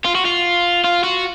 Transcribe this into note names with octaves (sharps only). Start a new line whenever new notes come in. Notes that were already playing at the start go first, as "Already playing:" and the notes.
F4
F#4
F4
F4
F#4